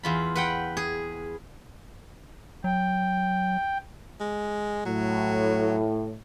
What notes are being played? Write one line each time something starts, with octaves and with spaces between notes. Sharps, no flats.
E2 F4 B5
B4 F#5 G5
G#4
F#3 G5
G#3
A2 F#3